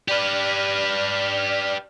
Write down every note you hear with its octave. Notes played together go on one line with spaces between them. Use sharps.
G4 B4 D5 F6